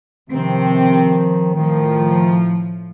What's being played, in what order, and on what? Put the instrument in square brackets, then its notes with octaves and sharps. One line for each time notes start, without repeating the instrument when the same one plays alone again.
[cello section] C3 C4 [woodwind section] D#3 F3
[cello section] A2 F3 [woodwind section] D#3